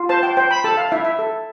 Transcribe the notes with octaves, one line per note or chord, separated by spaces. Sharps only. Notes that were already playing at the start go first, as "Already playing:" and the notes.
Already playing: F4
C5 A5
G5
C5 G5
B5
A4 A5
F5
E4 E5
E5
A4